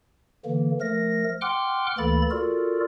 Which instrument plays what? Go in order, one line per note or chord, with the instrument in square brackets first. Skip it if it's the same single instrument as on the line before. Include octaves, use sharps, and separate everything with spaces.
[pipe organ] D3 E3 A#3
F3 A3 A#4 A#6
F#5 G5 C6 D6 F6 F#6
D2 E3 A#3 A4 B5 A6
F4 F#4 A4 A#4 D5